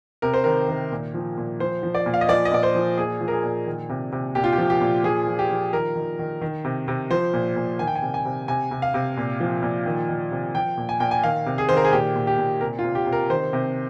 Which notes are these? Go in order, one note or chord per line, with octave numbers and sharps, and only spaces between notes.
C3 A#4
C5
D#3 A#4
D#3
A#2
F3
A#2
F3 C5
F3
D5
A#2
F5
D#5
F3 D5
D#5
A#2 D5
C5
F3
A#2 G#4
F3
A#4
G#4
A#2
D#3
C3
C3
A#2 G4
F4
G4
F3
G4
A#2
F3 G#4
F3
G4
F3
D#3 A#4
D#3
D#3
D#3
C3
C3
F3 C5
A#2
A#2
D#3 G#5
G5
G#5
C3
G#5
C3
C3 G#5
C3
F5
C3
A#2
F3
A#2
D#3
D#3
C3
F3 G5
A#2
G#5
A#2 G5
G#5
D#3 F5
C3
G#4
D#3 C5
A#4
G#4
A#2 G4
A#2
G4
A#2
C3 A#4
F4
C3
G4
C3
A#4
D#3 C5
C3